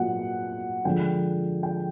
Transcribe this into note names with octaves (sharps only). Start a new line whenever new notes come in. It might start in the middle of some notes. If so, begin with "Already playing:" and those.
Already playing: A#2 F#3 F#5
D3 F3 G#3 G5
G5